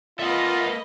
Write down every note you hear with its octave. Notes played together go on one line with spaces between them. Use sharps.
A#3 F4 A4 B4 D#5 E5 F#5